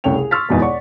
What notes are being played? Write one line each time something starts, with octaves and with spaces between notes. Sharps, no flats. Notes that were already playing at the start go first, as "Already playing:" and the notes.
C2 C#3 A3 C#5 G5 F7
G#4
C6 C#6 E6 F6 A6 B6
E2 G#2 B2 G#3 A#3
C#5 D5 F#5 C#6